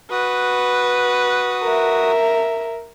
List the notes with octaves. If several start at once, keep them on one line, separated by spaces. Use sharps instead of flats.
F#4 B4 D#6
A#4 E5